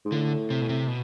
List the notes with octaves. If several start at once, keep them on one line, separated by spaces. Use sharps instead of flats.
G#2
A2 D3
C3
B2
C3
B2